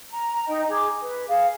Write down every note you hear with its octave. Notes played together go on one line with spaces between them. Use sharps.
A#5
D#4 D#5 G5
G#4 D6
B4
G#4 F5